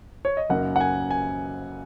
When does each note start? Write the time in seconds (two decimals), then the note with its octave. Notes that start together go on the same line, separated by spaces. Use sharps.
0.25 C#5
0.37 D#5
0.50 F#2 C#3 A#3 D#4 F#5
0.76 F#5
0.80 G#5
1.11 G#5